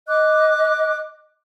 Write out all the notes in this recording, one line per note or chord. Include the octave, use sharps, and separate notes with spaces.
D#5 D6 F#6